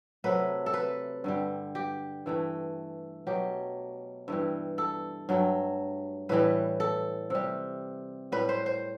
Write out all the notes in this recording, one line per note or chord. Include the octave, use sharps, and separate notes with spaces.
C3 F#3 A3 B4
A4
B4
G2 D3 G3
G4
G2 E3 A3
B2 F#3 A3 G4
G2 E3 G3
A4
G2 F#3 A3
A2 E3 G3 B4
A4
C3 G3
A2 G3 B4
C5
C5